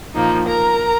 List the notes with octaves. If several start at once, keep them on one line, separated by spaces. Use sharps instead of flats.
A#2 F3 A#3 D#4
A#4 A#5